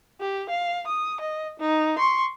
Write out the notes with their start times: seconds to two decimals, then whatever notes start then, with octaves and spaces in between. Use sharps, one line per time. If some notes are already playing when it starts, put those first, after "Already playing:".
0.20 G4
0.50 F5
0.87 D#6
1.21 D#5
1.59 D#4
1.99 C6 C#6